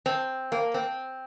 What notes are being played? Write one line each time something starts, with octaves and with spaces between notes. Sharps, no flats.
C4
A#3
C4